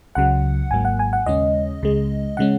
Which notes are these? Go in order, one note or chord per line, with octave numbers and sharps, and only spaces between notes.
C#2 C#3 F#3 F#5
G#1 G#2 F#3 A#3 G#5
F#5
G#5
F#5
D#2 C#3 G#3 C#4 D#5
C#2 C#3 G#3
C#3 G#3 C#4 F#5